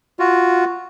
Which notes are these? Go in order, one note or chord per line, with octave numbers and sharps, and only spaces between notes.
F4 F#4